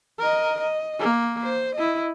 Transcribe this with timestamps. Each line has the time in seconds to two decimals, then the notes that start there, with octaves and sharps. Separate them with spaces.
0.20 A#4 D#5
0.60 D#5
1.00 A#3
1.42 C5
1.75 E4 D#5